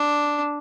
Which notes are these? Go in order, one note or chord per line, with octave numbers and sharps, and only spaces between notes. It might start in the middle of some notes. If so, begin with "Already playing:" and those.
Already playing: D4